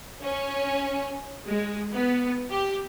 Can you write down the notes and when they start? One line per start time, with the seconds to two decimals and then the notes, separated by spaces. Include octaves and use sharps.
0.22 C#4
1.46 G#3
1.93 B3
2.50 G4